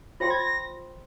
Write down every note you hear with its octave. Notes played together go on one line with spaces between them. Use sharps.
F4 C5 G5 C6 A#6
G#6
A#6